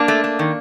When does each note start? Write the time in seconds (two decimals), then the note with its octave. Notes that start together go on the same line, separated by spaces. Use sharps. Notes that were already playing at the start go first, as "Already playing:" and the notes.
Already playing: A#3 D4
0.08 A3
0.24 A3
0.39 D#3